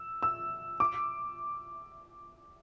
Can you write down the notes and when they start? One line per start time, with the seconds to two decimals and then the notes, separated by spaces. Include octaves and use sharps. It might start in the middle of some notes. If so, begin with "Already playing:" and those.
Already playing: E6
0.23 E6
0.80 D6